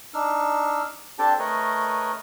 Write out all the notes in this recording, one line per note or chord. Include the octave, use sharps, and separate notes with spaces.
D4 D#4 E6 F6
C4 D4 G4 A4 G5 A5
A3 A#4 B4 C#5 D#5